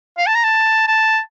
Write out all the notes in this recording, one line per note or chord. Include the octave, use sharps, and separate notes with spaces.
F5
A5
A#5
A5
A5